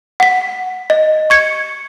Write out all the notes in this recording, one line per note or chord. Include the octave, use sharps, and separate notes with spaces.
F#5 B6
D#5
C#6 G#6 C#7